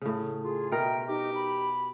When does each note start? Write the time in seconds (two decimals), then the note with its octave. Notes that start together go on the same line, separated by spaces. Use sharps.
0.02 A2 C#3
0.44 F4 G#4
0.72 B2 A#4 E5 G5
1.08 D#4 G4
1.34 B5